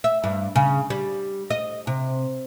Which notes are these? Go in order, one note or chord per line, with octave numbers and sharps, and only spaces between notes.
E5
G2
C#3
G3
D#5
C3